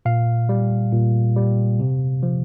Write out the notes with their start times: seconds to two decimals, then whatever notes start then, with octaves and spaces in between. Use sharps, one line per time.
0.05 A#2 F5
0.49 G3
0.92 A#2
1.36 G3
1.80 C3
2.23 F3